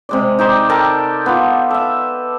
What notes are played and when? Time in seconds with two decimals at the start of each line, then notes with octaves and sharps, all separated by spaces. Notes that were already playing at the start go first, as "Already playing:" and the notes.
0.09 C3 G#3 D5
0.39 D#4 G4 C5 D5
0.69 A4 A#4 G5 A5
1.26 B3 F4
1.71 A4 E5